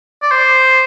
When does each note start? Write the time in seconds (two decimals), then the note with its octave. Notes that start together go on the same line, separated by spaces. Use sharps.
0.23 D5
0.31 C5